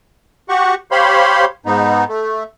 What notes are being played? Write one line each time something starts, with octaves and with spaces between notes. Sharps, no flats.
F#4 G4 F#5 C#6
G4 C5 C#5 F5 B5 C6
G#2 B3 D#4
A3